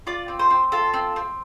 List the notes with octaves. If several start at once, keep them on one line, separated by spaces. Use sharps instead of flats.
F4 D5
C4
C5
C4
F4 A4
C4
C4